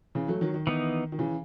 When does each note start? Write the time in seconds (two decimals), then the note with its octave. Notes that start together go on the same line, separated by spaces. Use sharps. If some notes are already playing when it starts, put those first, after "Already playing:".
0.15 C#3 E3
0.28 F#3 A3
0.41 D#3 F#3
0.54 D#3
0.67 E3 B3 D#4
1.12 D#3
1.19 C#3 E3